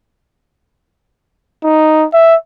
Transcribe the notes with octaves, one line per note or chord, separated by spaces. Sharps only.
D#4
E5